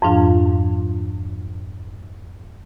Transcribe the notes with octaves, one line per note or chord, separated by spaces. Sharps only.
F2 G#2 F3 D4 F4 F5